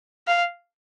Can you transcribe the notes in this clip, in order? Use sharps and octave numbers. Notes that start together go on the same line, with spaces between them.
F5